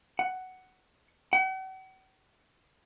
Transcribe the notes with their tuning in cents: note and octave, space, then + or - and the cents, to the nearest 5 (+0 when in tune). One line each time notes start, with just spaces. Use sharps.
F#5 +10
F#5 +45